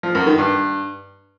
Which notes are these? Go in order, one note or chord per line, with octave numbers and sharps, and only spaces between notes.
F3
F#2
D#3
G2